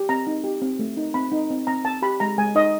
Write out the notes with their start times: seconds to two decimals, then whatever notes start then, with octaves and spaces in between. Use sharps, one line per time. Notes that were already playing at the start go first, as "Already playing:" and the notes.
Already playing: G4
0.09 C4 A#5
0.27 D#4
0.44 G4
0.62 C4
0.79 A3
0.97 D#4
1.14 C4 B5
1.32 D#4
1.50 C4
1.67 C4 A#5
1.85 C4 A5
2.02 G4 B5
2.20 G#3 A#5
2.38 G#3 G#5
2.55 D#4 D#5